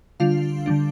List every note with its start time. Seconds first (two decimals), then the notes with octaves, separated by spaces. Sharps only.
0.20 D3 G3 D4 F4 F5
0.66 D3 G3 D4